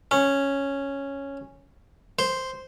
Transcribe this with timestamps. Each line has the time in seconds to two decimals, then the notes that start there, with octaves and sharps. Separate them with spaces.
0.11 C#4
2.19 C5